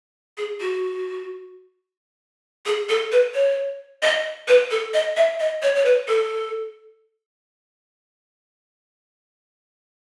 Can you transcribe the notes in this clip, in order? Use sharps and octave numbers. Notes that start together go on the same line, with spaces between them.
G#4
F#4
G#4
A4
B4
C#5
D#5
B4
A4
D#5
E5
D#5
C#5
C#5
B4
A4